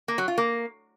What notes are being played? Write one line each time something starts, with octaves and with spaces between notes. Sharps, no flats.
A#3
F#3
F4
A#3